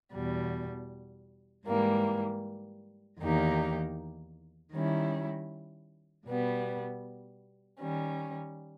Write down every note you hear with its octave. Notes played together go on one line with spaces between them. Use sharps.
E2 B2 G3
G#2 E3 G3 A#3
E2 D#3 A#3 D#4 G4
D#3 G3 C#4 E4
B2 G3 B3
D#3 G3 C#4